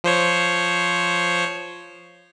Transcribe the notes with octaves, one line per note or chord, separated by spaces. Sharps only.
F3 C5 C#5